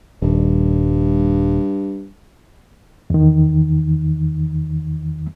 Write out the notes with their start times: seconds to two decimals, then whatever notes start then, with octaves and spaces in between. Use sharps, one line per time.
0.22 D#1 G2
3.10 E2 D#3